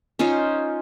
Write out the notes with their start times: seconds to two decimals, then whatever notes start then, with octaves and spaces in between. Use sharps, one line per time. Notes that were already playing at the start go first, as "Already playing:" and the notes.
0.19 C#4 D#4 F4 C5